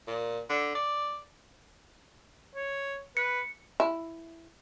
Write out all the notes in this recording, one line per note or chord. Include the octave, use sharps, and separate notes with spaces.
A#2
D3
D5
C#5
B4 C#7
E4